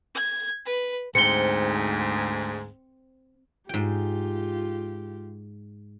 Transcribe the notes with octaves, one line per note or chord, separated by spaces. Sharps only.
G#6
B4
D2 G#2 C4 C#7 G7
G#2 F4 G4 G5